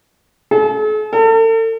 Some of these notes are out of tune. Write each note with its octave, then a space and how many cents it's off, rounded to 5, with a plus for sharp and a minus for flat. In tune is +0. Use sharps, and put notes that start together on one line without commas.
A4 -45
A4 +40